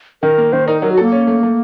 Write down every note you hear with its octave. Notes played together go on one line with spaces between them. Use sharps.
D#3 A#4
A#3
D#3 C5
D#4 A#4
F#3 A#4
F#4
A#3 A4
C#4
A3
A3